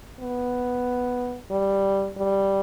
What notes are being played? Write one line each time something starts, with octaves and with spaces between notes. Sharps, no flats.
B3
G3
G3